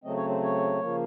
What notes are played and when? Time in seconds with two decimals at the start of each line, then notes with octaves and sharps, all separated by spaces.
0.04 C#3 F#3 A3 C4 D#5
0.17 C#5
0.29 C5
0.43 C#5
0.81 C#3 F3 A#3